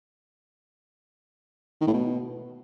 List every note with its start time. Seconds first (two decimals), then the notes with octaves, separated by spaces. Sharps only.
1.81 D#3
1.87 A2
1.94 B2